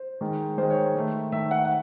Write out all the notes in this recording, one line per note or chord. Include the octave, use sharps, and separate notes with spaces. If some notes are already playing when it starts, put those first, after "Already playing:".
Already playing: C5
D#3 G#3
D#3 G#3 C5
C#5
D#3 A3
D#3 A3 E5
F#5
F#5